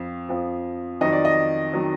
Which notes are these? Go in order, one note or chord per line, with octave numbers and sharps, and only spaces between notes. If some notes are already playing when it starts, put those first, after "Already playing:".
Already playing: F2 F3
F2 F3
F2 D#3 F#3 D#5
D5
D#5
D#3 F#3